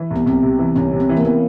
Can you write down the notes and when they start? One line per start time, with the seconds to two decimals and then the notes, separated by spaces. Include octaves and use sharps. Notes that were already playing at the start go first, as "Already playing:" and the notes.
Already playing: E3
0.10 C2
0.16 B3
0.26 C2 C4
0.42 C3
0.59 E3
0.75 C2 C#4
0.93 C3
1.00 C4
1.09 E3
1.17 A#3
1.25 E3 B3